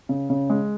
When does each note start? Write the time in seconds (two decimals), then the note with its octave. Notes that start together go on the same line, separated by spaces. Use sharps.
0.09 C#3
0.30 C#3
0.50 G#3